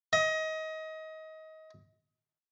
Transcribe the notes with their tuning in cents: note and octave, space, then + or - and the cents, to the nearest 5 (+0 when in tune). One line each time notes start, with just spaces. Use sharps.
D#5 +25